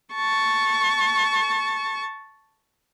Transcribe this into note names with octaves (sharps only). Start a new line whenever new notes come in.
A5 C#6